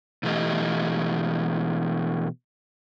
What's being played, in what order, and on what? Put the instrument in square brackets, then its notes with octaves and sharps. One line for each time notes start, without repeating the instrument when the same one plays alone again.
[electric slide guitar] B2 E3 A3 G4 D#5